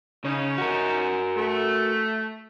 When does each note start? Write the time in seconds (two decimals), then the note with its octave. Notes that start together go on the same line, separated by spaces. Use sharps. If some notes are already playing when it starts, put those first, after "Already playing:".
0.25 C#3 C#4 D#4
0.58 F#4 A#4
1.36 A3